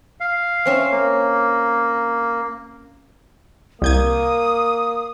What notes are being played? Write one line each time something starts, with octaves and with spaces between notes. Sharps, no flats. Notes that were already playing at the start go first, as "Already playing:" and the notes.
F5
C4 C#4 E5
A#3
C2 A#3 D#6 G6 G#6